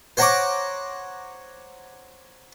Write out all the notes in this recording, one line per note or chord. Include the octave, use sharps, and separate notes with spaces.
C5 C#5 F#5 A#5 C#6 D6